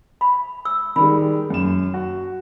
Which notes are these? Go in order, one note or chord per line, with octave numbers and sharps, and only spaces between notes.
B5
E6
D#3 G3 G#3 B5
F#2 E7
F#4